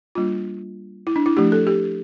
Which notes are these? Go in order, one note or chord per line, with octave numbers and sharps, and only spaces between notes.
G3 A#3 D4 F4
E4
D4
E4
F3 A3 D4 G4
A4
G4